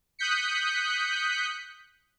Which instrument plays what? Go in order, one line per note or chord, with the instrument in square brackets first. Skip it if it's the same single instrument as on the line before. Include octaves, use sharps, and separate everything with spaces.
[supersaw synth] D#6 F#6 G6 B6 C#7